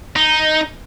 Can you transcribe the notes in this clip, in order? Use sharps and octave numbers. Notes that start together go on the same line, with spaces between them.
D#4